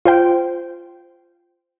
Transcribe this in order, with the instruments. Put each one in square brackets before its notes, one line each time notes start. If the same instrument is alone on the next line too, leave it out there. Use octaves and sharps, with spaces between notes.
[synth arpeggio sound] F4 C5 G5